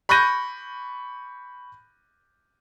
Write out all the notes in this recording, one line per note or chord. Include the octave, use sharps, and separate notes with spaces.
B5 C#6 F#6 G6 A#6 D#7